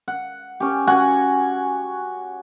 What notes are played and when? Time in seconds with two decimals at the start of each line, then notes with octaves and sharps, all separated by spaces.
0.08 F#5
0.60 C#4 G4
0.87 F#4 F#5 G#5